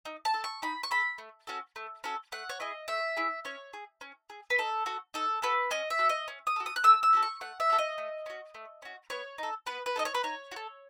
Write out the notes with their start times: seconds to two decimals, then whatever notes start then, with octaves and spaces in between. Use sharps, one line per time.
0.05 D#4
0.25 A5
0.34 A4
0.44 C#6
0.62 D#4 B5
0.83 C#6
0.91 A4 B5
1.18 A3
1.47 C#4 F#4 A4
1.76 A3
2.04 C#4 F#4 A4
2.32 A3 F#5
2.49 C#5
2.60 E4 G#4 D#5
2.88 A3 E5
3.17 E4 G#4
3.45 C#4 C#5
3.73 G#4
4.01 C#4
4.30 G#4
4.50 B4
4.58 D#4 A4
4.86 F#4 A4
5.14 D#4 A4
5.42 F#4 A4 B4
5.71 C#4 D#5
5.90 E5
5.99 F#4 A4
6.09 D#5
6.28 C#4
6.47 D#6
6.56 F#4 A4
6.66 D#6
6.76 F#6
6.84 A3 E6
7.03 E6
7.13 C#4 F#4 A4
7.23 C#6
7.41 A3 F#5
7.60 E5
7.70 C#4 F#4 A4
7.78 D#5
7.98 A3
8.26 C#4 F#4
8.54 A3
8.82 C#4 F#4
9.10 B3 C#5
9.38 D#4 A4
9.66 B3 B4
9.86 B4
9.96 D#4 A4 D#5
10.05 C#5
10.15 B4
10.23 D#4 C#5
10.51 F#4
10.56 A4